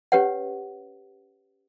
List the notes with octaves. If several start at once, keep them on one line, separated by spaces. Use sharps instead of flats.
C#4 G4 B4 C#5 F#5